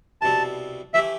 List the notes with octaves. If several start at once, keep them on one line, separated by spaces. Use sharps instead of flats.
C2 B2 G3 C4 A5
E3 A3 E4 G4 E5